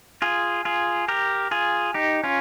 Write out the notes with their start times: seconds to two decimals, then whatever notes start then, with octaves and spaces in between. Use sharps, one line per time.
0.22 F4 G#4
0.65 F4 G#4
1.08 G4 A#4
1.51 F4 G#4
1.94 D#4 G4
2.24 C#4 F4